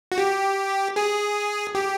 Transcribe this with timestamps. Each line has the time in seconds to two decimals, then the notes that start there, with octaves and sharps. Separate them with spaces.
0.12 F#4
0.18 G4
0.96 G#4
1.75 G4